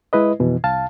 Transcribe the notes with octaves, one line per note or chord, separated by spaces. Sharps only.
G#3 E4 B4 D#5
F2 B2 E3
C2 F5 A5